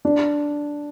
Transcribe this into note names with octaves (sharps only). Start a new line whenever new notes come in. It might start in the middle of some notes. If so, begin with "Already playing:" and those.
D4